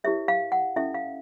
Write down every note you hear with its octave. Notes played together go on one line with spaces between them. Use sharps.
E4 G4 A#4 C#5 E5
F5
F#5
C#4 E4 A4 E5
F5